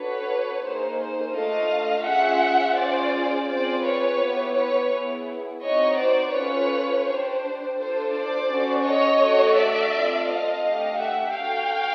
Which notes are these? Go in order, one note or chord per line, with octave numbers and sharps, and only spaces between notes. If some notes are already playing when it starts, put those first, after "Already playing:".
Already playing: D4 F#4 A4 B4 C#5
A#3 D#4 G#4 C5
C5
A3 D4 F4 A4 D#5 F5
C#4 F4 G#4 E5 F#5
C#4 F4 G#4 C5 D5
C4 F4 G#4 C5 D5
B4 C#5
B3 E4 G4
B4 C#5
B3 E4 G#4
C4 D#4 F#4 C#5 D#5
C5 D5
C#4 F4 A4 B4 C#5
D4 G4 C5
D4 F4 A4 C5
C5 D5
C#4 F#4 A4
C#5 D#5
A3 D4 F#4 A4
D5 E5
C4 F4 A4
D#5 F5
A3 D4 G4
E5 F#5
D4 F#4 A4 F5 G5